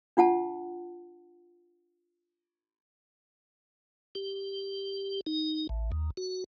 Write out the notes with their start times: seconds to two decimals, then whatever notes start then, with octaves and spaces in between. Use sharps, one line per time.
0.17 D4 F4 F#5 A5
4.15 G4
5.26 D#4
5.69 A1
5.92 D#2
6.17 F#4